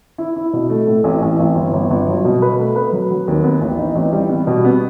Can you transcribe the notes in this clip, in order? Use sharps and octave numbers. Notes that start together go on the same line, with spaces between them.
E4
E4
B2
A3
A2
A1
A1
A1
G1
G1
G1
F#3
B2
B4
A3
B4
F#3
F#3
D#2
B3
A1
D#4
A1
G3
B3
B2
B3